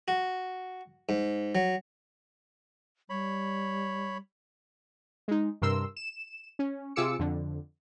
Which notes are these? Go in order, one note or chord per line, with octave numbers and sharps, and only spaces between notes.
F#4
G#2
F#3
G3 C#5 B5
G#3 D#4
G2 C3 A#4 C6 E6
E7
C#4
C3 F4 G#4 D6 E6 C#7
F2 D3